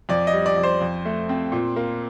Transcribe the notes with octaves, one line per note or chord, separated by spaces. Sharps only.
F2 D5
D#5
G3
D5
F2
C5
F2
A3
C4
A#2
A#3